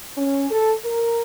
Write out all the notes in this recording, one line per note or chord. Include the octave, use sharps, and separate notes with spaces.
C#4
A4
A#4